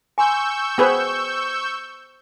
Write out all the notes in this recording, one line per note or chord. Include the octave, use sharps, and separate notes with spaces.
G#5 C6 C#6 E6 G6
B3 G#4 B4 C5 G5